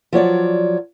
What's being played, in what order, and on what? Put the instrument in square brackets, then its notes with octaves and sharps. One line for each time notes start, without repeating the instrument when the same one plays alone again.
[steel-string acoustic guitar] F3 F#3 C#5 D5